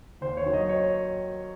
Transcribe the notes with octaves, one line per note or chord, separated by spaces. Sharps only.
D#2 C5
C#5
D#3 F#3
D#5
C#5